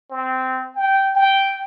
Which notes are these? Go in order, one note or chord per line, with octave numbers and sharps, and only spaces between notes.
C4
G5
G5